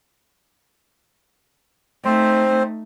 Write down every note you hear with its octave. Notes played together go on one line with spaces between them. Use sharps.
A3 C4 D#4 C5